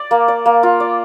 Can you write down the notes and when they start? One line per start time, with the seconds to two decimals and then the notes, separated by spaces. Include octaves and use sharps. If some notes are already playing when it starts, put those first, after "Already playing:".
Already playing: D5
0.11 A#3
0.28 D5
0.46 A#3
0.63 F4
0.80 D5